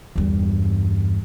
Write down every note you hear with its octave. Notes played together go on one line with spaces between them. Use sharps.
E2 G2